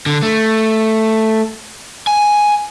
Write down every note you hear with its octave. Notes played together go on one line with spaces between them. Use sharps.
D3
A3
G#5